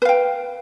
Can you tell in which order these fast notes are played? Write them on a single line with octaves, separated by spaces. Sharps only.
B4 F5 G5